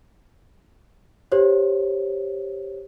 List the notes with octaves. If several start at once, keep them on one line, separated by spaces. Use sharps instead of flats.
G4 C5 C#5